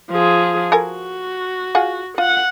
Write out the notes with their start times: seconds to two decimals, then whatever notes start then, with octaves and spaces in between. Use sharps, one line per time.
0.11 F3 G#4
0.72 F#4 A4 A#4 G#5
1.75 F4 G#4 F#5
2.18 F4 F#5